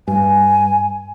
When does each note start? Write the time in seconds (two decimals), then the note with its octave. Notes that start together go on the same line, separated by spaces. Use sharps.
0.08 G2 G#5